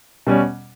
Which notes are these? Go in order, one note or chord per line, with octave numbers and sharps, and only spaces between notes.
B2 G3 C#4